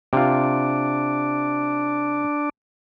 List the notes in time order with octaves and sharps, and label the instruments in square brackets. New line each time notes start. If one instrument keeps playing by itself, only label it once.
[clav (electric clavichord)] C3 F4 [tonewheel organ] D4